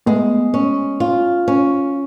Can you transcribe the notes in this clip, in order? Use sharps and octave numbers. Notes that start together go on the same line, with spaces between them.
G#3 A3 B3
C#4
F4
C#4